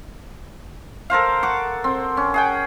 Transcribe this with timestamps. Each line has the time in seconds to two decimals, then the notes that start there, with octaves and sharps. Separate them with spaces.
1.10 A4 A#4 C5 F5
1.43 F#5 C#6 D6
1.84 C4
2.17 C#4
2.34 G#4 F#5 G5